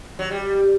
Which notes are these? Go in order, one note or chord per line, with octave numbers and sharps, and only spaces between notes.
F#3
G3